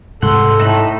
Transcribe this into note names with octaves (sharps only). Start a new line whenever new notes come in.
G#2 C3 G#3 A4 F#5 C6
A2 D#4 A5 B5